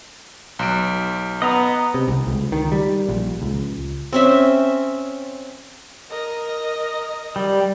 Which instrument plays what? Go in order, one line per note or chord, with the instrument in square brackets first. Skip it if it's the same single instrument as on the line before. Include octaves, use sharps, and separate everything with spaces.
[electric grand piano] B1 D7
[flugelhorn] B3 [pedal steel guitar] D#5 A#5
[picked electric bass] C3
C2
C#2
D#3
G3
A#1
C#2
[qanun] C4 C#4 E5
[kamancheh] A#4 D#5
[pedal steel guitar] G3